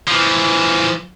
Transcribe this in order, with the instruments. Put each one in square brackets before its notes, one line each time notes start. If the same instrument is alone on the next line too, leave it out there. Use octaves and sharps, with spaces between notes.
[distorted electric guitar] E3 F3